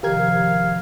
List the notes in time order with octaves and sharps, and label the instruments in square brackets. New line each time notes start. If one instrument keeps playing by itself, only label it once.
[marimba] C3 D#3 F3 [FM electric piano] G4 A#4 G#6 [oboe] F5